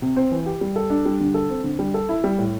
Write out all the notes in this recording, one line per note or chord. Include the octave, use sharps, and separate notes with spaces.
C3
C4
E3
G4
G3
A4
D4
G3
D3
A4
C4
D3
G3
A4
E4
G3
A2